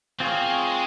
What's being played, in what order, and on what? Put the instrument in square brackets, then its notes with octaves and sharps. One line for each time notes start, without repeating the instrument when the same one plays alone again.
[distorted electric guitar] A#3 [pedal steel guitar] C4 F4 G#4 C#5
[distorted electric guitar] G#3